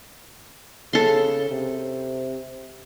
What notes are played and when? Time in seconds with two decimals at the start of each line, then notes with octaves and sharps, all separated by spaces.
0.93 C#3 A4 C6
1.51 C3